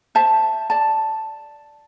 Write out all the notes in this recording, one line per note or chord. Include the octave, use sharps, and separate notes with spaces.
C5 E5 A5
D5 A5